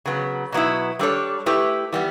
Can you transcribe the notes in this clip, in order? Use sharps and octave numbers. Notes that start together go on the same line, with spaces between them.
C#3 F#3 B3
B2 F#3 B3 E4
G3 D4 A4 C#5
A3 E4 G4 B4
E3 G3 B3